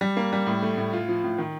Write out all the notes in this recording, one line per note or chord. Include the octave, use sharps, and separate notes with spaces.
G3
A#3
G3
A2
A3
A2
F4
F3
A2
D#3